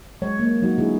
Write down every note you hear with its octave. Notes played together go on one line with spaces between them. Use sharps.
F#3 G#3 C#5
A#3
F#3 D#4 F#4
D3 E4 G#4